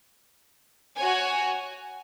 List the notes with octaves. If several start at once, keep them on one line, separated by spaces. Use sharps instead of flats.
F#4 C#5 G#5